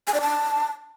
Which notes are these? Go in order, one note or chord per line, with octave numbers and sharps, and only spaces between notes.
G#5
D5
A5